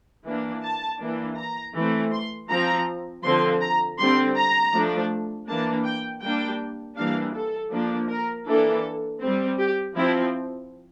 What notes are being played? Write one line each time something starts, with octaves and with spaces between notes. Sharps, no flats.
E3 A#3 D4
A5
E3 A#3 D4
A#5
E3 A3 C4
C6
F3 C4 A#5
D3 F3 C4 C6
A#5
D3 G3 C4 C6
A#5
F3 A3 D4
E3 A#3 D4 A5
G5
G3 A#3 D4 G5
E3 G3 A#3 D4 F5
A4
F3 A#3 D4
A#4
E3 A#3 D4 A4
G3 C4
G4
F3 C4 E4